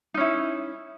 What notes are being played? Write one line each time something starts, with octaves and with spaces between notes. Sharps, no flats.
C#4 D#4 E4